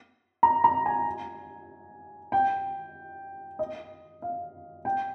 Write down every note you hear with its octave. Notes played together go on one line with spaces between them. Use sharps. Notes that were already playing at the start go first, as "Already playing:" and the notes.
A#5
A#5
G#5
G5
D#5
F5
G5